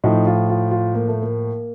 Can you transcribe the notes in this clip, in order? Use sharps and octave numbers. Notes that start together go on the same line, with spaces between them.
A2 F3 D#4
F4
F4
F4
A#3
A3
A#3